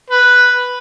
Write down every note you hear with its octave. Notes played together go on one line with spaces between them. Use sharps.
B4